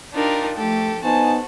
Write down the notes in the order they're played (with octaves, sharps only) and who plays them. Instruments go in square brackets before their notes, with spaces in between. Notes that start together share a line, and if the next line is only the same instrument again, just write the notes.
[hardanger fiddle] D4 A#4 [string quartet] D#4 F4 G4
[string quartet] F3 G4 [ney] A3 [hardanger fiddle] A4
[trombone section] B3 D#4 [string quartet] F#4 [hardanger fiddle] C5 A5 [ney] G#5